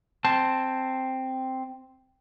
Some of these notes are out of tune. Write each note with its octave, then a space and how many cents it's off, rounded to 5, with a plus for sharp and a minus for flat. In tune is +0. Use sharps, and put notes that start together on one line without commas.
C4 +0 A5 +0